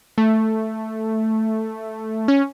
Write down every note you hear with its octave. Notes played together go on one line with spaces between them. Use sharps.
A3
C#4